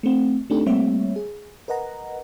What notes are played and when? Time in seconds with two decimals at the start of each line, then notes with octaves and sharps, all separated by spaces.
0.03 A3 C4
0.50 A3 C4 D4 D#4 G4 A4
0.66 G3 A3 A#3 C4 C#5 E5
1.16 G#4
1.68 A#4 B4 D#5 F#5 A#5